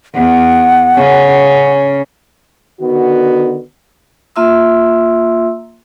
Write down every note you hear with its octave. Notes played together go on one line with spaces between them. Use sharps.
E2 F#5
C#3 C#4
D3 D#3 B3 F#4
A#3 F4 E5 C6 E6